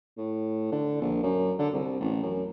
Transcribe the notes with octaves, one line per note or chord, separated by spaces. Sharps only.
A2
D3
A#1
F#2
D3
C2
A1
F#2